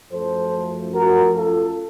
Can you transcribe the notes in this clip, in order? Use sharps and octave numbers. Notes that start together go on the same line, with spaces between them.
F#2 F3 A3 A4 C5
F#4 A#4
F4 A4